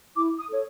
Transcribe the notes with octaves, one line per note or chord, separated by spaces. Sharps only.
E4 D6
D#6
A4 C#5